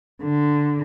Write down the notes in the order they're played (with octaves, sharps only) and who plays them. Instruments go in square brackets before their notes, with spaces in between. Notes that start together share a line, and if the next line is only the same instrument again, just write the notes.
[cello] D3